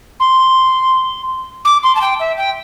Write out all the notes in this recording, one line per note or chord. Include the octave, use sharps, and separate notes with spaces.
C6
D6
C6
A5
G5
E5
G5